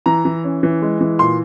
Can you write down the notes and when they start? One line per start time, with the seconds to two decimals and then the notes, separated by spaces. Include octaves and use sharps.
0.06 E3 A#5
0.25 E3
0.44 C#4
0.63 E3
0.82 G#3
1.01 E3
1.19 A#2 C6